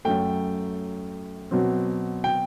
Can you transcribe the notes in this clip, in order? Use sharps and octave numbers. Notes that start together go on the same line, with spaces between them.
F#2 F#3 A3 G5
B2 F#3 C4
G5